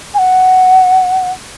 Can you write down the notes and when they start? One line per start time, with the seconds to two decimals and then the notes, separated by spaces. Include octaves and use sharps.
0.14 G#5
0.19 F#5